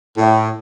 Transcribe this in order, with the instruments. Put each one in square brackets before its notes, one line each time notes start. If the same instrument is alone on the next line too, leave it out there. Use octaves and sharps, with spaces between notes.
[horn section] A2